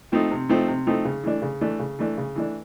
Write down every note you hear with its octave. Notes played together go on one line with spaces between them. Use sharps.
F3 A3 C4 D#4
C3
F3 A3 C4 D#4
C3
F3 A3 C4 D#4
C#3
E3 A3 D4
C#3
E3 A3 D4
C#3
E3 A3 D4
C#3
E3 A3 D4